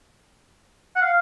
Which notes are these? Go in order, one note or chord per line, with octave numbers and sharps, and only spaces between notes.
F#5
F5